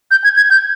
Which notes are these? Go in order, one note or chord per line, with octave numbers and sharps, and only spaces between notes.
G6
G#6
G#6
G6